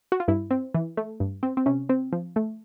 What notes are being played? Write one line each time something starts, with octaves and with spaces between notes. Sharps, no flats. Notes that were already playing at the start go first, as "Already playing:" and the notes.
F#4
F4
G2 E4
C4
E3
A3
G2
C4
C4
C3 C#4
C4
F3
A3